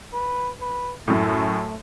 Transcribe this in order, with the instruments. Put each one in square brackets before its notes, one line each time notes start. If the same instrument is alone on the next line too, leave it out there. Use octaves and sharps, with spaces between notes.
[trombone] B4
B4
[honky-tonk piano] F#2 A2 [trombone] A3